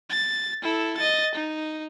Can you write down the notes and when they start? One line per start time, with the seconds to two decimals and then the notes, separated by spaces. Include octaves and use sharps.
0.10 A6
0.62 E4 A4
0.97 D#5 A6
1.35 D#4